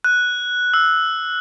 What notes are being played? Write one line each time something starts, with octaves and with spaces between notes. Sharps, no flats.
F#6
E6